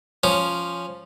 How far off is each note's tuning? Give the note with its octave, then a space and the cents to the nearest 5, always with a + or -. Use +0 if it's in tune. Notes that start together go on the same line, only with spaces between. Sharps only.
F3 +0 C#4 +0